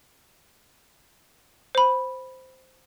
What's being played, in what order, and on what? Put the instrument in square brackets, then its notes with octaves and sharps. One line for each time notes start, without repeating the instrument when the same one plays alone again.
[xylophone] C5 B5